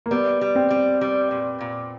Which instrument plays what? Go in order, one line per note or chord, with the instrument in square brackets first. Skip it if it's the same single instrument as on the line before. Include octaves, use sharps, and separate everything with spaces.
[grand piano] A#3
[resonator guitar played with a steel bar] G3 [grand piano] B3
[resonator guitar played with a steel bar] G3
[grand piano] C4
[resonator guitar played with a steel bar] G3
G3
A#2
A#2